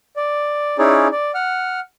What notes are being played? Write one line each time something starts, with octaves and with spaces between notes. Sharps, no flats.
D5
C#4 D#4 E4 G#4 C#5 D5
D5
F#5 F6